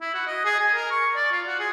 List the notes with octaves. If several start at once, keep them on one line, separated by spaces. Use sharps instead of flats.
E4
F#4
D#5
G#4
G#5
A#4
C#6
D5
F4
F#4
G#4